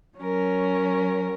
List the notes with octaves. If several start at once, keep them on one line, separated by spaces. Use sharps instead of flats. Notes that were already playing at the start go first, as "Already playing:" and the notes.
F#3 C#4 A#4